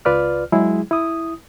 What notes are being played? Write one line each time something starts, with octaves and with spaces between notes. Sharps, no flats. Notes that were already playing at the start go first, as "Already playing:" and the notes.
C#2 F4 B4 D5 F6
F#3 G#3 E4 G#4
E4 D#6